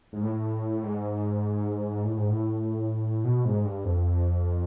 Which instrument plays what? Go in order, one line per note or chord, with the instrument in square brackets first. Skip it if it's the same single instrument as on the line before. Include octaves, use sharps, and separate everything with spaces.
[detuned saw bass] G#2
A2
G#2
A2
G#2
A2
B2
G#2
G2
F2